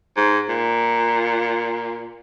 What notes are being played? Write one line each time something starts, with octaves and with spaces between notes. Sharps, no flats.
G#2
A#2